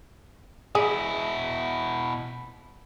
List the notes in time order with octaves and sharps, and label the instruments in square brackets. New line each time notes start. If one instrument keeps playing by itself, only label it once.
[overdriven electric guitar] B2 E4 [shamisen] G#4